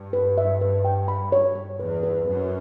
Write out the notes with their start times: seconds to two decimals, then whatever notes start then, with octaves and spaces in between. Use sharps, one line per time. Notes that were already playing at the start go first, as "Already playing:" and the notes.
Already playing: G2
0.13 B4
0.38 E5
0.61 B4
0.85 G5
1.08 B5
1.32 C#5
1.55 C#5
1.79 E2 B4
2.03 B4
2.27 F#2 B4